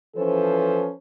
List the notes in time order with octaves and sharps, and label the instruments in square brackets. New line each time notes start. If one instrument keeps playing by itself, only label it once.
[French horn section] E3 F3 C#4 A4 B4 C5